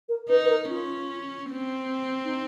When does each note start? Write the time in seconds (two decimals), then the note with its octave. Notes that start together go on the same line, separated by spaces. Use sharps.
0.08 A#4
0.29 D#4 B4
0.45 B4
0.49 A#4
0.70 C#4 F4
1.51 C4
2.25 D#4